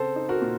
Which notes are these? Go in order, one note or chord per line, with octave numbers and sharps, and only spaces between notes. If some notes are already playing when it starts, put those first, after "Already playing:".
Already playing: C#3 C4 A4 C5
D#4
F#4 A#4
A#2